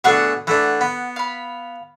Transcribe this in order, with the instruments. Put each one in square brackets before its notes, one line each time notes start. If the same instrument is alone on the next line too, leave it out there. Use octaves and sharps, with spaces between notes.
[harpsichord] B2 A3 D4 [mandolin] G#4 F#5
[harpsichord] E3 A3 D4 [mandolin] F#5
[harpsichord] B3
[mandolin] F5 B5